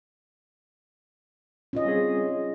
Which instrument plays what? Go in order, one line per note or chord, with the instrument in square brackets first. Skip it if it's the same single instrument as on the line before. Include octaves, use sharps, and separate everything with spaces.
[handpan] C#4 F4 D#5
[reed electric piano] G3 C4 G#4